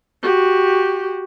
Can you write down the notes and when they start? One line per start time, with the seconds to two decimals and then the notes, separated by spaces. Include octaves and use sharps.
0.23 F#4 G4